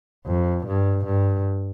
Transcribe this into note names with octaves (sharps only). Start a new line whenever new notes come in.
F2
G2
G2